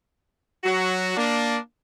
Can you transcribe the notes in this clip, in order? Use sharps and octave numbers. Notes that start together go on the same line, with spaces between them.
F#3 F#4
A#3 D4